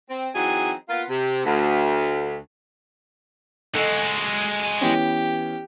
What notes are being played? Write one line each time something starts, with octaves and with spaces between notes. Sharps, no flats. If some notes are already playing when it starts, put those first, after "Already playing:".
C4
E3 F#3 C4 D#4 G#4
A#3 B3 F4
C3
D2
G#3 F#4 A4 D#5
E3 B3 C#4 G4